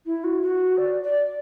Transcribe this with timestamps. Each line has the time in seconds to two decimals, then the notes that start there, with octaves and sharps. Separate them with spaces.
0.05 E4
0.23 F#4
0.42 F#4
0.77 D5
1.03 D5